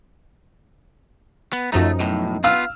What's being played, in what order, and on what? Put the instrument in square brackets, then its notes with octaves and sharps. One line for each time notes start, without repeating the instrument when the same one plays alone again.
[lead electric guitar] B3
[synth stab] F#2 F3 D#4 [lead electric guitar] A3
[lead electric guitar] B1 A2
[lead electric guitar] B3 F4 [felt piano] F5 E6 F6